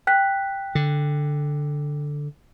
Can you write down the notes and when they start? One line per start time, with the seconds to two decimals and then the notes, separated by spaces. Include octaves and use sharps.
0.07 G5 F#6 B6
0.75 D3